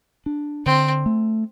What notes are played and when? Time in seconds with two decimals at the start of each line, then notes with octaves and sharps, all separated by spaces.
0.26 D4
0.66 D3 C4
1.06 A3